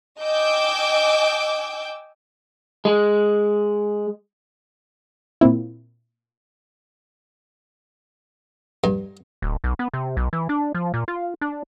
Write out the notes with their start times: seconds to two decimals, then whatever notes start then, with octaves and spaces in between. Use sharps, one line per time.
0.22 D#5 G5 G#5 D6 E6 G6
2.85 G#3
5.41 A#2 A#3 C4 E4
8.84 G2
9.42 D1
9.64 B1
9.79 B3
9.93 C3
10.17 B1
10.33 E3
10.49 D4
10.75 F3
10.94 A#2
11.08 F4
11.41 D4